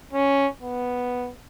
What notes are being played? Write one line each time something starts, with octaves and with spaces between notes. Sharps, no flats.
C#4
B3